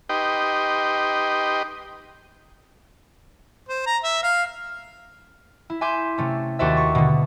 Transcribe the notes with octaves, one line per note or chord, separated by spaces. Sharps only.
D#4 G4 B4 D#5 G5 C6
C5
A#5
E5
F5
E4
E5 G#5 C6 D6 G6
C3 A3 C#4
D#2 F#4 A4 C5 D5 E5
C#6
B2 D3